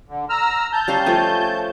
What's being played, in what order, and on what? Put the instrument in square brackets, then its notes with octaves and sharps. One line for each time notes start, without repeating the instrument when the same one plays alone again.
[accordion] D3
A#5 E6 F6
A5 G6
[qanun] G3 C#4 F5
F3 A3 G#5